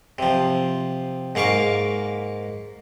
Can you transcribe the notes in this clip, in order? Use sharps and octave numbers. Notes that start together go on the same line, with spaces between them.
C3 F3
G#2 A#3 F5 C#6 D6